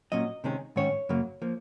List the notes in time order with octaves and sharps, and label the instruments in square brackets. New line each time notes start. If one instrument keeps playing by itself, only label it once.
[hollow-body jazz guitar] A#2 F#3 C#4 D#5
C3 D#3 G#3 C#4
G#2 D#3 G#3 C#4 C#5
F#2 C#3 F#3 A#3
F3 A#3